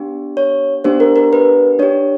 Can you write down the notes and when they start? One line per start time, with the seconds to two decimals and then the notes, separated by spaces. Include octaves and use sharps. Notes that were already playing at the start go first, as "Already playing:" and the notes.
Already playing: B3 D4 G4
0.37 C#5
0.84 B3 D4 G4 C5
1.00 A#4
1.16 A#4
1.33 B4
1.79 D4 C#5
1.83 G4